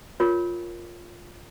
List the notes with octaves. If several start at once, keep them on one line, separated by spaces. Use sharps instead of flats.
F4 A#4 C#5